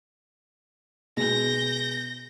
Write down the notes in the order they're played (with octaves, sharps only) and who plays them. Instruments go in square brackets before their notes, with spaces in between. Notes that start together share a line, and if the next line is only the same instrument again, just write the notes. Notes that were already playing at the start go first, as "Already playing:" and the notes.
[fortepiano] B2 G#3 [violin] G6 A#6